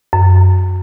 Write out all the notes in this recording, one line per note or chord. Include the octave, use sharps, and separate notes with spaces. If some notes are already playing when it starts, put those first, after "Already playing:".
F#2